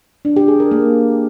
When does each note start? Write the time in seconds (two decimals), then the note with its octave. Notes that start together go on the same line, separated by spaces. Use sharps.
0.25 D4
0.36 G4
0.48 G#4
0.60 A#4
0.71 A#3